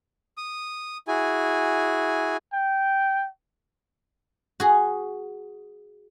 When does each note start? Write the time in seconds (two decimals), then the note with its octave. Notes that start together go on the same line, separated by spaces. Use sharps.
0.37 D#6
1.08 E4 F#4 G#4 G#5
2.53 G5
4.60 F#4 G#4